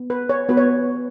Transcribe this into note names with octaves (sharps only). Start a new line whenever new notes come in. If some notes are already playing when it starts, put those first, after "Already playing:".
Already playing: B3
B4
C#5
B3 F#4 B4
C#5